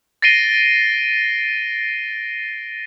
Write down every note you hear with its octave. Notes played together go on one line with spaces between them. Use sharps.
A6 A#6 C7 D7 D#7 G7